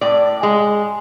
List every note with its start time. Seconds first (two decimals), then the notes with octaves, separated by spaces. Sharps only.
0.01 A2 D5
0.43 G#3